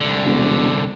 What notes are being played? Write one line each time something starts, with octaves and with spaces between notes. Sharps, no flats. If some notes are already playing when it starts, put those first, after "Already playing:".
C2 D3
E1